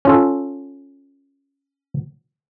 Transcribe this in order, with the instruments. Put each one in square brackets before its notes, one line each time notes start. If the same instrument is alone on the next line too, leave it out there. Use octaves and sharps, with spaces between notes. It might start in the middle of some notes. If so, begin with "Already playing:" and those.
[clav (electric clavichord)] C#4 F4 A4